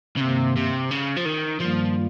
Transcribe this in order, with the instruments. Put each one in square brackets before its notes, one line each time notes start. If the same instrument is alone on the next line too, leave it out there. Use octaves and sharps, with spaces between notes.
[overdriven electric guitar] C#3
[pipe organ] G2 D#3 A#3 [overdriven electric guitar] C3
[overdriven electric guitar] C3
C#3
F3
D#3
[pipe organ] G2 D#3 G3 A#3 F4 [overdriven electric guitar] F3